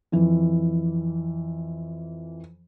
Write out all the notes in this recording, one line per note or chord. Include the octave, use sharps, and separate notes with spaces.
F2 E3